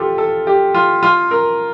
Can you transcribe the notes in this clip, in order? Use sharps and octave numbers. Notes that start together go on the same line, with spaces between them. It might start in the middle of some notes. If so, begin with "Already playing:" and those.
Already playing: F4 G4 A4
A4
G4
F4
F4
A#4